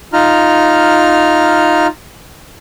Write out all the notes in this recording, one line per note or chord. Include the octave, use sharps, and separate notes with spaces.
D#4 F4 A#5 F6